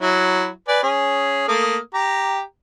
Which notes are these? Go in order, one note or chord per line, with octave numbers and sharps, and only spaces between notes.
F#3 E4
B4 D5 G#5
C#4 G#4
A3 A#3 D#6
G4 A#5